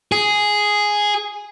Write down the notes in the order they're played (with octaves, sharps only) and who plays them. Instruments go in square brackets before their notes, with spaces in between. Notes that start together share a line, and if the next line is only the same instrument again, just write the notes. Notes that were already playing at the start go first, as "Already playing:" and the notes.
[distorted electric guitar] G#4